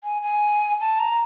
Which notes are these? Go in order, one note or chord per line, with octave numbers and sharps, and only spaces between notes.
G#5
G#5
A5
A#5